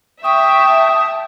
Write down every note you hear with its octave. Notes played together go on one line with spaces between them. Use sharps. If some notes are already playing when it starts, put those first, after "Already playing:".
E5 G5 A5 C#6 D#6